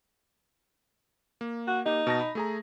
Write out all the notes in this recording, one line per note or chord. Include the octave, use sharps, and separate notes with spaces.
A#3
F#4
A#3 D#4 G4
B2 A5 A#6
B5
A3 G#4 A#5